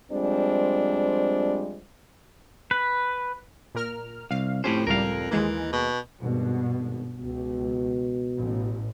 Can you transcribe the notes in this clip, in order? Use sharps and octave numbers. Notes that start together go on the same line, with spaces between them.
F3 G3 G#3 C4 D4
B4
A#2 A#4 F6
C2 F5
F2 A2 C#4 G4 C5
C#2 A2 G3 A#4 F5
D#2 E3 G#3 A#3
B2
G#1 G2 B2
G#1
C#2 B2
A1